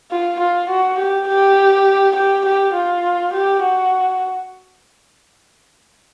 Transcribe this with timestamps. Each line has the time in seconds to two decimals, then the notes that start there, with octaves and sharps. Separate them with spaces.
0.11 F4
0.40 F4
0.70 F#4
0.99 G4
1.28 G4
2.16 G4
2.46 G4
2.74 F4
3.34 G4
3.63 F#4